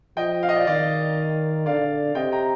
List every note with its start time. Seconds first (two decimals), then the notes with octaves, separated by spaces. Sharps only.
0.17 F3 D#5 G5
0.43 F5
0.49 D#5
0.56 D5 F5
0.67 D#3 D5 F5
1.66 D3 D5 F5
2.15 C3 D#5 G5
2.32 G5 A#5